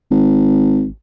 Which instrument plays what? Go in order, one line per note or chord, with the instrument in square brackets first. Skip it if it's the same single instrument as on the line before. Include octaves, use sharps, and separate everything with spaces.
[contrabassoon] G#1